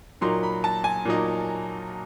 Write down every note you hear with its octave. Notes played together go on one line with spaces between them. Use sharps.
A#2 F#3 A#3 D#4 C6
B5
A5
G#5
A#2 F#3 A#3 D#4